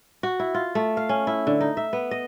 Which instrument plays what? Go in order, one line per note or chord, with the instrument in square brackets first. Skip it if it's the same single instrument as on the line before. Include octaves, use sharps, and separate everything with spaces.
[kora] F#4
E4
F4
A3
F5
C#4
E4
D3
D#4
E5
B3
D#5